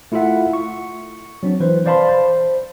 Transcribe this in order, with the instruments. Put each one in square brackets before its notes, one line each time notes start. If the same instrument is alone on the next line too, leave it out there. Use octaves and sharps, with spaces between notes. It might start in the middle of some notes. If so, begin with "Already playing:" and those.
[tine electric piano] A3 E4 F4 A4 E5 F#5
C#6
F#3 C4 D4
E3 B4 C5
C5 D5 F5 A5 B5 C6
C5